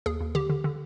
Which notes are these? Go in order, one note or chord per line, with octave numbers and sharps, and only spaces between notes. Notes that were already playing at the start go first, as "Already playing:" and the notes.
D#2 G#4
D#2
D3 G4
D3
D3